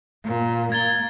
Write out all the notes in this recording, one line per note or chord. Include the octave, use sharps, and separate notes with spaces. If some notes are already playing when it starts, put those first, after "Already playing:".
A#2
A#3 G#6 A6 G7